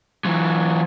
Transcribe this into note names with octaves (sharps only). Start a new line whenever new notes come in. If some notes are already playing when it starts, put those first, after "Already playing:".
E3 F#3